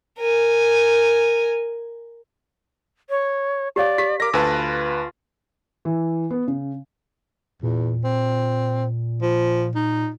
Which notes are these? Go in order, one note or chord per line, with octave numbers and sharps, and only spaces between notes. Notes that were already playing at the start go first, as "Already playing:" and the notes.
A#4 G#5
C#5
G4 C#5 D5 F5
G4 B6
A#4 D5 D6 A#6
D2 F4 B4 G#5 A5 E6
E3
B3
C#3
E2 A#2
C4
F3
D#4